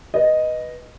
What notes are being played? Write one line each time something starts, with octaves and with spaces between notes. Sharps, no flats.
B4 D#5